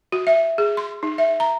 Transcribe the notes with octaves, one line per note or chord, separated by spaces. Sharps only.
F#4
E5
G#4
C6
D#4
E5
A#5